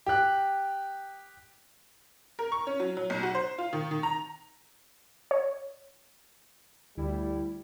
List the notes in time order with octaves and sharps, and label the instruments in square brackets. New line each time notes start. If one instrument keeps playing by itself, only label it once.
[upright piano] G4 F#6
[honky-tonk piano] A#4
C#6
C#4
F#3
F#3
B1
F#4
C5
F4
D#3
D#3
A#5
[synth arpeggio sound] C#5
[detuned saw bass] D2 [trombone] G3 [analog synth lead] E4